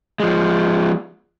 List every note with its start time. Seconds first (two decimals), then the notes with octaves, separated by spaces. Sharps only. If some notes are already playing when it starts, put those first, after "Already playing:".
0.20 F3 G#3